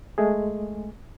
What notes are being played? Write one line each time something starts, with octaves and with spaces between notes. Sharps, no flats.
G#3 A3 G#4